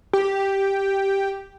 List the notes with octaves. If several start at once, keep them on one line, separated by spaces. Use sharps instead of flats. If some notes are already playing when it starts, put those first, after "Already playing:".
G4